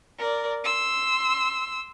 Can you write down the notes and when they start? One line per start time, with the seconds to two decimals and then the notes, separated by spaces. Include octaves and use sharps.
0.19 A#4 D5
0.64 C6 E6